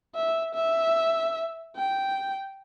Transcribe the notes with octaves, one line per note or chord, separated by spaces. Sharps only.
E5
E5
G5